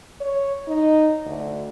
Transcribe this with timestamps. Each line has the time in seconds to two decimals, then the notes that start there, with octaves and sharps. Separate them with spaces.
0.20 C#5
0.67 D#4
1.26 D2